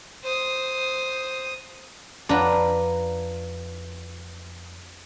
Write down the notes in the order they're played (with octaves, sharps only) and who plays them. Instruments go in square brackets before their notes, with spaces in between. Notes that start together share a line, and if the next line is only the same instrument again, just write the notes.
[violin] C5 D#6
[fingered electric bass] F2 [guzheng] D4 F4 B4 [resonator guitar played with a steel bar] A#5